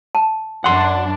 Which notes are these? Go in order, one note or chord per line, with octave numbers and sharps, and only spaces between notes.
A5
F#2 D4 F#5 C6